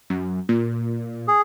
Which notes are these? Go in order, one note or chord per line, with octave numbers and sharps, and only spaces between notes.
F#2
A#2
G#4